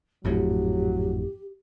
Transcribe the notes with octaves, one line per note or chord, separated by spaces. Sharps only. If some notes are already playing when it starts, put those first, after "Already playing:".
G#1 F2 A2 F#3 G4